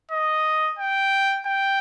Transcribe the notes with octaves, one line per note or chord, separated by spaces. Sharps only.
D#5
G5
G5